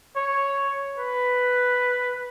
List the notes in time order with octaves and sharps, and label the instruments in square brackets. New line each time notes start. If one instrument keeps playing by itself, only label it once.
[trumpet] C#5
B4